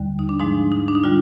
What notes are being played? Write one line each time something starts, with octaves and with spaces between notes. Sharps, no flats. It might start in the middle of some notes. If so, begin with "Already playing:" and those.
Already playing: D#2 D3 G3
D#4
D4
G#2 F3 G#3 D#4
D#4
D4
D#4
D3 G3 F4